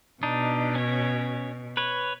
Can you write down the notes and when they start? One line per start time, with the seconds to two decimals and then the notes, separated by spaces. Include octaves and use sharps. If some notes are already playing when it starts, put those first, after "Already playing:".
0.23 B2 D4 D#4
0.75 C#4 C#5
1.77 B4 C#5